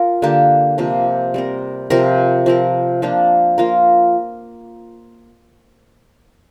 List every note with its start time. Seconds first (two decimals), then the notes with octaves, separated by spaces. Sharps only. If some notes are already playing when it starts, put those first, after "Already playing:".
Already playing: F4 A#4
0.22 D3 A#3 G4
0.78 C3 F3 A#3
1.34 G3 C4 A#4
1.90 C3 F3 C4 A#4
2.46 F3 C4 A#4
3.02 F3 A#3 D4 F4
3.58 A#3 F4 A#4